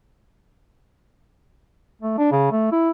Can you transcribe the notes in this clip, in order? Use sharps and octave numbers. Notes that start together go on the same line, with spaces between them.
A3
D4
C#3
A3
E4